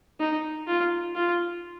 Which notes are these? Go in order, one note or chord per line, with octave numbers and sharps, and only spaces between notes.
D#4
F4
F4